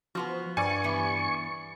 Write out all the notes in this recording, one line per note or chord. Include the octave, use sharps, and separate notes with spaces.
F3 B3 F4 F#4
G2 D5 G#5 C#6
E3 B3